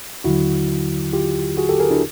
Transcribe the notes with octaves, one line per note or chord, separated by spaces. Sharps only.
D#2 D3 F#3 E4 F#4
F4 G4
F#4 G#4
G4 A4
G#4 A#4
D4 E4